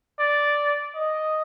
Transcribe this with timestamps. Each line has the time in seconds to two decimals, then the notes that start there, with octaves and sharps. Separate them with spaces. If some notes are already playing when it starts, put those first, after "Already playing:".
0.19 D5
0.95 D#5